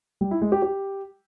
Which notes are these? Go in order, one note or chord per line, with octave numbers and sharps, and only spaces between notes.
G3
E4
G#3
G4
G4